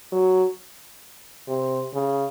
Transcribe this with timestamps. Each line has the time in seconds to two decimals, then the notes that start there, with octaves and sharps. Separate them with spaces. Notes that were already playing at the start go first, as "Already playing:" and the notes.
0.12 F#3
1.48 C3
1.94 C#3